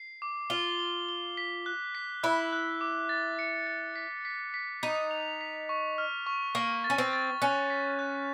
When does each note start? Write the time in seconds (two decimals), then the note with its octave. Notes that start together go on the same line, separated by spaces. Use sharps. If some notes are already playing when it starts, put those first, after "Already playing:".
Already playing: C7
0.22 D6
0.50 F4 G7
0.79 G7
1.09 G7
1.37 B6
1.66 F#6
1.95 B6
2.23 E4 F#6
2.53 F#6
2.81 D6
3.09 A6
3.39 C#7
3.67 A6
3.96 B6
4.25 B6
4.54 B6
4.83 D#4 B6
5.11 F7
5.41 B6
5.69 C#6
5.98 F6
6.26 C#6
6.55 A#3 C#6
6.84 A6
6.90 C#4
6.98 C4
7.13 A6
7.41 C#4 F#6
7.70 B6
7.99 F#6